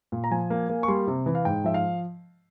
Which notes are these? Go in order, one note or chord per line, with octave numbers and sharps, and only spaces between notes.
A#2
A#5
F3 G#5
A#3
A#3
C#6
G3 C6
C3
E3
F5
G#2 G5
F3 E5
F5